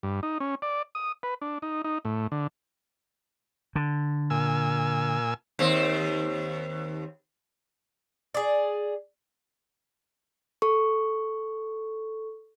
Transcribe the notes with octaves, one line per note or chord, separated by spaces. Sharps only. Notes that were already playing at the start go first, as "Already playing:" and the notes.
G2
D#4
C#4
D5
D#6
B4
D4
D#4
D#4
A2
D3
D3
A#2 G#5 E6
D#2 C4
G#4 D5
A4 C#6